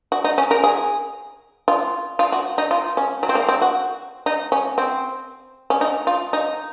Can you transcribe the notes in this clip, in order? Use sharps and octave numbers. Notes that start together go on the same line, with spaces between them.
F#4
D#4
C#4
A#4
G#4
F4
F4
F#4
D#4
F4
C#4
F#3
C4
A#3
C4
F#4
D#4
C#4
C4
C#4
D#4
F4
D#4